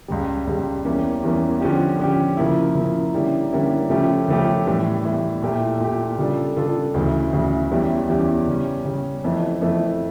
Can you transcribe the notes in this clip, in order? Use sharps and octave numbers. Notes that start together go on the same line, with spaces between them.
C#2 C#3 G3
C#2 C#3 G3
E2 E3 G3 A#3 C#4
E2 E3 G3 A#3 C#4
D3 F3 C#4 G4
D3 F3 C#4 G4
C#3 F3 A#3 E4
C#3 F3 A#3 E4
D3 G3 A#3 C#4 E4
D3 G3 A#3 C#4 E4
C#3 F3 A3 C#4 G4
C#3 F3 A3 C#4 G4
A2 E3 G3
A2 E3 G3
A#2 A3 E4 G4
A#2 A3 E4 G4
C#3 G3 D4 F4 A4
C#3 G3 D4 F4 A4
D2 C#3 E3
D2 C#3 E3
E2 E3 G3 C#4 G4
E2 E3 G3 C#4 G4
C#3 G3 C#4
C#3 G3 C#4
F2 E3 A3
F2 E3 A3